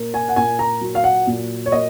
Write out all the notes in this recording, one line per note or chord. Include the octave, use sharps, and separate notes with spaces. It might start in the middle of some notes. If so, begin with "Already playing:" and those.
Already playing: A#2 A#3
G#5
F#5
A#2 G#5
A#5
F#3
F5
F#5
A#2
C#5
A#3 D#5